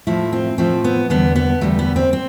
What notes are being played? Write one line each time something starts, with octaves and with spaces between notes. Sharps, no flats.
A2 F3 A3 E4
C4
A2 F3 A3 C4
B3
E2 D3 G3 B3
B3
E2 D3 G3 A3
B3
C4
C4